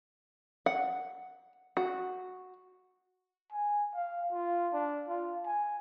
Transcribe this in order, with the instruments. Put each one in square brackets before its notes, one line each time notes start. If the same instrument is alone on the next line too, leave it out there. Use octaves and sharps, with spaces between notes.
[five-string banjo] F#5
F#4
[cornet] G#5
F5
F4
D4
F4
G#5